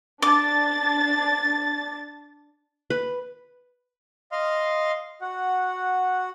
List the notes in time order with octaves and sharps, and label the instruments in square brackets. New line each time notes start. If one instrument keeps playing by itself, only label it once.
[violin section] D4 A6 [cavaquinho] D6
[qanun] B4
[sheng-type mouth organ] D#5 F5 C6 F6
F#4 F#5